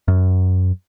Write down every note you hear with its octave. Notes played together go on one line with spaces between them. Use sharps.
F#2